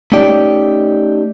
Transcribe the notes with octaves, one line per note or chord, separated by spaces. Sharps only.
A3 C#4 D#4 G4 D5